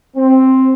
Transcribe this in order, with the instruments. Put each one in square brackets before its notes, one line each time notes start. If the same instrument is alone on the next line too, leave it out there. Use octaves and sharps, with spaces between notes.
[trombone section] C4